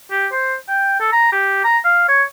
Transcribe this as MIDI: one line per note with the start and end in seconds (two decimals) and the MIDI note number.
0.11 0.27 67
0.32 0.55 72
0.69 0.99 79
1.00 1.11 69
1.13 1.30 82
1.33 1.62 67
1.64 1.79 82
1.85 2.06 77
2.09 2.23 73